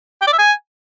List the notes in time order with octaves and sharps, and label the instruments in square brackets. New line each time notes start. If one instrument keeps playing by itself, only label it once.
[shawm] G5
D5
E5
G#5